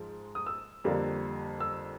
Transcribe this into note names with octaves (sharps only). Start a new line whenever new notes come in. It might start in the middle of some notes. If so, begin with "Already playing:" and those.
Already playing: G#2 F3 G#3
D#6
E6
F2 D3 G3 A#3 D4
E6